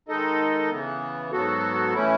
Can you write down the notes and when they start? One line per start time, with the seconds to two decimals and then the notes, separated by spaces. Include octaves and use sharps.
0.08 D#3 G#3 D#4 A4 D#5
0.70 C#3 E3 B3
1.32 G#2 F#3 B3 F#4 A4
1.93 A2 E3 A3 C#4 E4